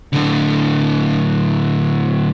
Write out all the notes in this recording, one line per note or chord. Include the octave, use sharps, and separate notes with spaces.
A2 D3